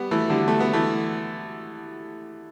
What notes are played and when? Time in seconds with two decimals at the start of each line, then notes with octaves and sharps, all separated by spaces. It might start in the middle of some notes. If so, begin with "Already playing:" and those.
Already playing: G3 B3
0.11 E3 A3
0.29 D3 G3
0.48 A3
0.60 B3
0.73 E3 A3